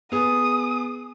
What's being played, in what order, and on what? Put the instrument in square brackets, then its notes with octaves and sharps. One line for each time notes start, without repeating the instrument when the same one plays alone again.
[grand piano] B3 G#4 [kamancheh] D#6